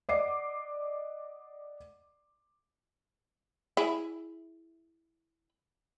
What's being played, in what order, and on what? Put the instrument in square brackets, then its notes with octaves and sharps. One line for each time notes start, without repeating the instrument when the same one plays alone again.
[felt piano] D5 D#5 F#5 D6 C7
[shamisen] E4 G#4